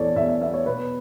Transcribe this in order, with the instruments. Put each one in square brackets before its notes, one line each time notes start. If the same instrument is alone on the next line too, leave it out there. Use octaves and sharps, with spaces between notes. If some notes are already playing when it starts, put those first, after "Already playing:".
Already playing: [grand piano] E2 E3 A4 C#5 D5
E2 E5
E5
B3 E5
C#5
B2 B4